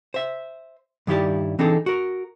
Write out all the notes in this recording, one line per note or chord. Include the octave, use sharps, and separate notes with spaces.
C5 E5
G2 D#3 G3 E4 G4 D5
E3 C4 D4 D#4 G#4 A4
F#4 A#4